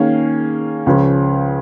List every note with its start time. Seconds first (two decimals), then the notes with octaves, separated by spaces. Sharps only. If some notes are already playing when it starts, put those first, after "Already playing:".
Already playing: D#3 A#3 C#4 G#4
0.86 C#2 C#3 F3 C#4